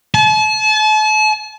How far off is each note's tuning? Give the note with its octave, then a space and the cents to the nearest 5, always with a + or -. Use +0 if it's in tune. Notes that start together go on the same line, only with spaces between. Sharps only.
A5 -40